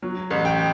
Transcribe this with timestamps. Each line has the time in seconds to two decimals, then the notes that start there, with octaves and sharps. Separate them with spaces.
0.02 F#3
0.30 A1
0.45 G5